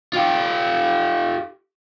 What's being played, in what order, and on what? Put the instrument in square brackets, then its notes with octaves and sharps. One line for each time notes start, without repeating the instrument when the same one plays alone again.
[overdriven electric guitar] F4 G4